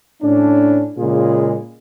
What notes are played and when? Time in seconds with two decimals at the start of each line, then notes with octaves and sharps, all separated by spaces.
0.22 A2 C#4 D4
0.98 A#2 C#3 G#3 F4 G#4